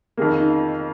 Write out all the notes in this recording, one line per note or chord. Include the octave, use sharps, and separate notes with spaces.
F2 D#3 A#3 G#4
F4
D#4
F4